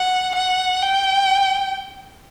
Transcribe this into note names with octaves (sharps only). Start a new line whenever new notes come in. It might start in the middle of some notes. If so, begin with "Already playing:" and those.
Already playing: F#5
F#5
G5